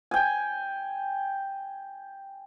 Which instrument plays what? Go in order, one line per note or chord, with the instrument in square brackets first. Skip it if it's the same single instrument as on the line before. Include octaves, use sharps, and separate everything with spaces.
[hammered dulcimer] G5 G#5